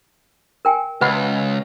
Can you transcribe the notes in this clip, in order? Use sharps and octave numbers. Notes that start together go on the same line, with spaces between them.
A#4 G5 G#5
C#2 B4 F#5 B5